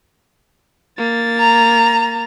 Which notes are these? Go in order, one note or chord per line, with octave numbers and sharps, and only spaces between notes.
A#3 A6
A#5